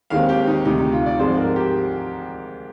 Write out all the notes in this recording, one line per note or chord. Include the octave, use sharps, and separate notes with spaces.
D#2 D#3 G#3 C4 F5
G4
D#4
D2 C3 D#3 D#4
D#4
F4
D5
G#2 F3 G#3 C4 C5
A#4
G4